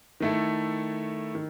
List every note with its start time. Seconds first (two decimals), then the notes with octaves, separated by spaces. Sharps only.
0.20 D#3 A3 E4 A4
1.35 D#3